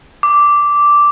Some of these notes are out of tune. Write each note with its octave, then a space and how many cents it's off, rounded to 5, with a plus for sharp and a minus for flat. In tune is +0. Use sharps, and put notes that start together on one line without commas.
D6 -5